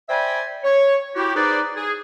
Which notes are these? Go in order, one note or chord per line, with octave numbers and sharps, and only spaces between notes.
C5 D5 E5 G5 G#5 B5
C#5
E4 F#4 G4
D#4 G#4 B4 C5 D5
G#4